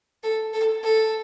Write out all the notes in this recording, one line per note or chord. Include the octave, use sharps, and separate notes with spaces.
A4
A4
A4